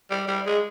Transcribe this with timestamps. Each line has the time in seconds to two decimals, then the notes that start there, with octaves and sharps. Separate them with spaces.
0.11 G3
0.28 G3
0.46 G#3